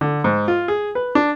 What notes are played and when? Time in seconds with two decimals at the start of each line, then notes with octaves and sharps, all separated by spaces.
0.01 D3
0.24 G#2
0.48 F4
0.68 G#4
0.95 B4
1.15 D4